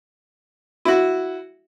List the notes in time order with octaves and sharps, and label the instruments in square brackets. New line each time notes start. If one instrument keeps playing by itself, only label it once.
[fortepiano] E4 F#4